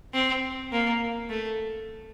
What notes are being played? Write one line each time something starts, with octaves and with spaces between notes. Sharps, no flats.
C4
A#3
A3